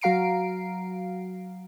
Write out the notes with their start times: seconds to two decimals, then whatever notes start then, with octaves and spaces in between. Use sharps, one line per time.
0.01 F#3 F#4 F5 A#5 C7 D7